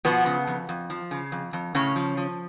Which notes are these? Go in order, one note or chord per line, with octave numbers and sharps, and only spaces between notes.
B2 F3 B3
C#3
F2
F2
F3
C#3
F2
F2
A2 C#3 C#4
F3
F3